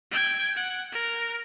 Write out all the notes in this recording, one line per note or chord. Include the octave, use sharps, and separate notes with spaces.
G5 G#6
F#5
A#4